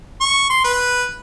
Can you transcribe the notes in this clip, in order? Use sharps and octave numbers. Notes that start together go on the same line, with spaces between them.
C#6
C6
B4